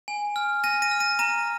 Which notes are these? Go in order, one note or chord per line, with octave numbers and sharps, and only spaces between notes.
G#5
F6
G#5 A#6 D#7
A#6 D#7
F6
A#6 D#7
A#5 A#6 D#7